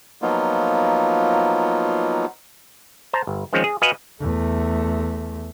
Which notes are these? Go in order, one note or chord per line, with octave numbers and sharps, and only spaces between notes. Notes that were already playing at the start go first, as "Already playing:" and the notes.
F3 F#3 A#3 B3 D#4 F4
C5 A5 A#5
G1
D#3 F3 G#3 C4 C#4
G#4
F#4 B4 D#5 F5 F#5 G#5
E2 A3